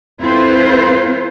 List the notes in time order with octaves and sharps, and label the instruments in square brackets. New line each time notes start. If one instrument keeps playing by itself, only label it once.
[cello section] C4 E4 F4 A4 B4 C5